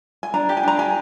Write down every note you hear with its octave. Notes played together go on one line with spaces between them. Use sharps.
G#5
D4 A#5
G4
G#5
D4 A#5
G4 G#5